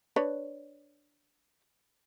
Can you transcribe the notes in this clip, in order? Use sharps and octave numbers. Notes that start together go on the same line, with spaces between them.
D4 B4 C#5